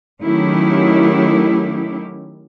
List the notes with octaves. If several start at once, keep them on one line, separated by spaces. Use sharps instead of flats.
D#3 F#3 A3 C#4 E4 G4